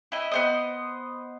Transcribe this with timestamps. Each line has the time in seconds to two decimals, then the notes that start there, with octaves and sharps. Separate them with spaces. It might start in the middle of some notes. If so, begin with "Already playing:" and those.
0.12 E4 D#5
0.32 B3 C5 D#5